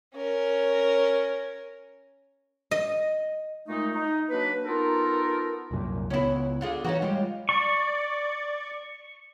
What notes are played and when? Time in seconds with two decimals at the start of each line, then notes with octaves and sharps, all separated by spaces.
0.15 C#4 A#4
2.71 D#5
3.68 A#2 G#3 A3 D#4
3.95 D#4 D#5
4.31 F#3 A#3 D4 B4
4.65 B3 D#4 F4 A4 A#4
5.71 C2 F#2 A#2
6.10 C#2 B3 C#4 E4
6.61 D3 F4 G#4
6.84 E3 C#4 D#4 F#4
7.02 G3 G#3 F4 G4
7.49 D5 C#6